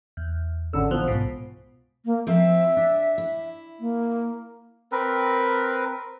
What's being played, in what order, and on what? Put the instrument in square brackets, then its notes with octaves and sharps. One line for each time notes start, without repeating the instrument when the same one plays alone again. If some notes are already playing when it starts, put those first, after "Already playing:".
[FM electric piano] E2
[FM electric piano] G#1 C#4 E6 [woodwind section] D3
[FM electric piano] A1 E3 F#6 [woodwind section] F3 B3
[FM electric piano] C2 G#2 B2
[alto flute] A#3
[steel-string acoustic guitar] F3 C4 C5 [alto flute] E5
[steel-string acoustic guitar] D4
E4
[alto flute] A#3
[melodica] C4 A#4 B4